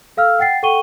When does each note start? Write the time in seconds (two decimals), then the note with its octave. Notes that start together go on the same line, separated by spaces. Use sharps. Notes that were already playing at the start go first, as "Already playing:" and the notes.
0.17 A4 F5 E6 F6
0.39 F#5 G5 A6 C7
0.63 A4 F#5 G5 C#6 D#7 G7